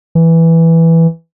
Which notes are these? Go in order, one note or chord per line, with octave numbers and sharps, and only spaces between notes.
E3